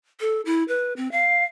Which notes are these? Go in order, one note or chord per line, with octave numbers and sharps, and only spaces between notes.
A4
E4
B4
C4
F5